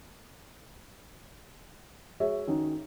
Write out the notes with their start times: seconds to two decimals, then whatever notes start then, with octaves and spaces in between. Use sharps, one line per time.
2.20 G#3 F#4 G#4 C#5 E5
2.47 D#3 C#4 D#4 F#4